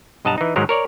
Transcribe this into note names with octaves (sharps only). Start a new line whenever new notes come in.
B1 G2 D#5 F#5 A5 A#5
E3 D#4
G#2 D#3 F#3 A#4
A#4 C#5 D5